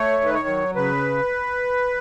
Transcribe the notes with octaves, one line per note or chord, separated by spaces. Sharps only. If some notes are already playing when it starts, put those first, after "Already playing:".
Already playing: A3 C#5
D#3 B4
C#5
F#3
C#3 B4